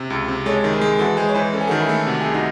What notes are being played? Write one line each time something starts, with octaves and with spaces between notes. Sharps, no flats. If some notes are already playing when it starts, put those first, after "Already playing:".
Already playing: C3
C#2
C3
G#3 A4 C#5
D#3
G#4 C5
G#3
E3 F#4 A4
G#3 G#4 C5
C#5
E3 G#4 C5
C#4 A4
G#4
F#4 A4
D#3
E4 G#4
A3
C3 F#4
C2 G#4
D#4 F#4